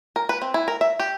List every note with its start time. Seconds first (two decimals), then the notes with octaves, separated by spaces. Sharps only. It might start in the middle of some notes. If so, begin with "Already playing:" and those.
0.16 A#4
0.29 B4
0.42 C4
0.54 E4
0.68 A#4
0.81 E5
1.00 G4